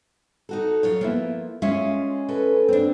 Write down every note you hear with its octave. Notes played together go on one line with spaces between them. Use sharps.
D#4 F#4 A4
F#2 F4 C#5
F3 A#3 B3 E4
G#3 C#4 F4 E5
F#4 A4 B4
C4 D4